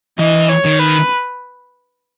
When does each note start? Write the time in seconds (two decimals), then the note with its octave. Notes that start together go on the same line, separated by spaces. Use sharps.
0.19 E3 D#5
0.49 C#5
0.65 D#3
0.80 B4